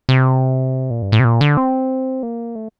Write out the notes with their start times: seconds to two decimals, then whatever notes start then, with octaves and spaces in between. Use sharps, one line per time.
0.09 C3
0.90 A#2
1.02 G2
1.12 A2
1.20 C3
1.25 A#2
1.41 D3
1.57 C4
2.23 A#3
2.55 A3